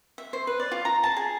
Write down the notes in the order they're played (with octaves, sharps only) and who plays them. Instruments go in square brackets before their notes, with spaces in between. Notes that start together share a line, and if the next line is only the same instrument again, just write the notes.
[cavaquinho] E5
C5
B4
D5
F4
A#5
A5
G#4